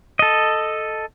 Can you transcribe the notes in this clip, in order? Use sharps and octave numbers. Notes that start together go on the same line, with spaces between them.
A4 D#5